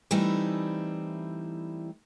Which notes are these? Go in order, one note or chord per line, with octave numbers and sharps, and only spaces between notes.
E3 G3 A3 C4 D#4 E4